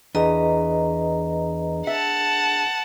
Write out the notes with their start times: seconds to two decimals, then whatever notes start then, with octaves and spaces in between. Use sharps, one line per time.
0.15 E2 D4 G#4 B4 D#5 A#5
1.87 E5 F#5 A5